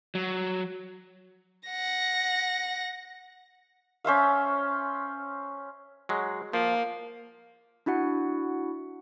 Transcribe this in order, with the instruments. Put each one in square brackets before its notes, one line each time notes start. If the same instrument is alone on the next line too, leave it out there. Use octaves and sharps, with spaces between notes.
[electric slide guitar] F#3
[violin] F#5 A#6
[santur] C#4 C5 E5 F5
[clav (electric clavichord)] F#3 G#3
[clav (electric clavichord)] F3 [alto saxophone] A#3
[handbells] D4 E4 F#4 F#5